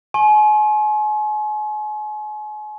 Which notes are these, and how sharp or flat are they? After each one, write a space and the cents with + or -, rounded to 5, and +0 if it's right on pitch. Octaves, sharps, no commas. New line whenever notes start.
G#5 +35 C6 +45